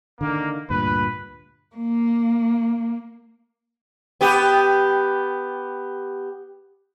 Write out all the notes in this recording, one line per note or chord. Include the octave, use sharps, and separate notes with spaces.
D3 D#3 A#3
D2 G2 A#2 B4
A#3
B3 G4